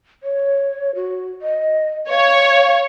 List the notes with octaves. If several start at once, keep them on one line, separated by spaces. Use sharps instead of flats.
C#5
F#4
D#5
C#5 F5